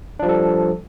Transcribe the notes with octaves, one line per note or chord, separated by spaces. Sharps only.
F3 G3 D4 A4